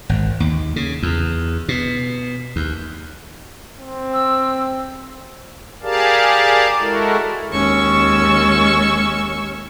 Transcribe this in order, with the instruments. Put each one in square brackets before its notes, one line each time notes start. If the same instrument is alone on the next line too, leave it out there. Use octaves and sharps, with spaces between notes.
[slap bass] G#1
D#2
C#3
E2
B2
D#2
[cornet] C4
[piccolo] E6
[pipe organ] G4 G#4 A#4 D5 F5 A5
G#3 E4 F#4 A4 A#4
[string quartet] D#2 G#3 C#4 C#6 E6